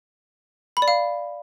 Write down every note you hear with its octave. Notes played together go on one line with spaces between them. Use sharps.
B5
D5
F5